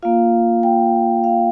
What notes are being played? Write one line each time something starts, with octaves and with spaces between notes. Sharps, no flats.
A#3 F4 F5
G5
F5